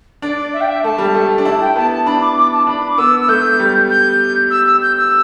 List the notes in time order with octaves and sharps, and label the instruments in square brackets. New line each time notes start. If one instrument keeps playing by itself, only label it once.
[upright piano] D4 [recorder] D5
[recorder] E5
G5
E5
[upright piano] A3 [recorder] A5
[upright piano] G3
A3
D4
[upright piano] E4 [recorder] A5
[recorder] G5
[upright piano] B3 [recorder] A5
[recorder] A5
[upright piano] D4 [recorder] B5
[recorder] D6
D6
A5
[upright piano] D4 [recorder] B5
[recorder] D6
[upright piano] B3 [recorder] E6
[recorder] E6
[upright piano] A3 [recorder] G6
[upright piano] G3
[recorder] G6
E6
E6
G6
E6